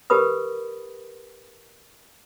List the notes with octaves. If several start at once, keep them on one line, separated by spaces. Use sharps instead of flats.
G4 A#4 B4 B5 D#6